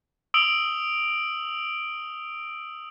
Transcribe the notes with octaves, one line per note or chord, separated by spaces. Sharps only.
D#6 E6 D7 F#7 G7